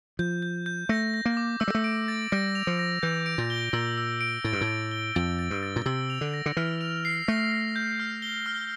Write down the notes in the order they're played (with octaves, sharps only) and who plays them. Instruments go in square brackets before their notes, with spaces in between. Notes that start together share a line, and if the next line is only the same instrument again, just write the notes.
[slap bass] F3 [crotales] G6
[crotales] G6
G6
[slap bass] A3 [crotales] A#6
[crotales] A#6
[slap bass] A#3
[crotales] D6
[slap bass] A3 [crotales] E6
[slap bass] G3
A3
[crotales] D7
A6
[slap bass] G3 [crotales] A#6
[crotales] F7
[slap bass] F3
[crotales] A#6
[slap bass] E3 [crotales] G6
[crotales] D7
[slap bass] A#2
[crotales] G7
[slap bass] A#2 [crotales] E6
[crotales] E6
D7
[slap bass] A2 [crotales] A6
[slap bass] G2
A2
[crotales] A6
G7
[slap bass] F2 [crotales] A6
[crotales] A6
[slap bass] G2
[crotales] A6
[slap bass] A#2
[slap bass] C3 [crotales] E6
[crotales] F7
[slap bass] D3
[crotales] A#6
[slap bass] D3
[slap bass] E3 [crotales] F6
[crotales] F7
C7
[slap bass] A3 [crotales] A#6
[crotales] A#6
G6
F6
G7
F6